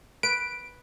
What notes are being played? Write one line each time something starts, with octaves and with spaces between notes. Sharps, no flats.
B4 D7